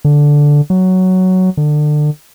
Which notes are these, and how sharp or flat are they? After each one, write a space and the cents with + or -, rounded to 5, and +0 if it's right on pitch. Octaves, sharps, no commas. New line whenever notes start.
D3 -5
F#3 +5
D3 +30